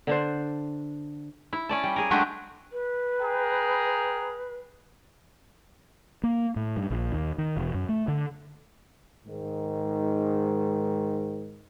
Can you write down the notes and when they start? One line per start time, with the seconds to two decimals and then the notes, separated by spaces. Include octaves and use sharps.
0.07 D3 D4 C5
1.53 E4
1.69 C#4 D5 A5
1.83 G3
1.96 G#4 A#4
2.11 F#3 G#3 A3 D4 F#4 G4
2.72 B4
3.19 G#4 G5 A#5
6.23 A#3
6.56 A2
6.77 G2
6.90 A#1
7.12 D#2
7.38 D#3
7.57 E1
7.74 F#2
7.89 A3
8.08 D3
9.27 G#2 D#3